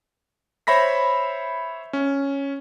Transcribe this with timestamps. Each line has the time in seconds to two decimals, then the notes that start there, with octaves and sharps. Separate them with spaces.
0.67 C5 C#5 E5 B5 A#6 B6
1.93 C#4